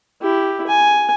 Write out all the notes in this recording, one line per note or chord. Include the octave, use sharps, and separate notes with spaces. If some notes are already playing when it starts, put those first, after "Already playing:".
E4 G4
G#5